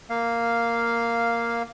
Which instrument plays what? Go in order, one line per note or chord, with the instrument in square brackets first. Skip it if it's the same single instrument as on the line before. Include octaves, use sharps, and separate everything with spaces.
[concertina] A#3 F5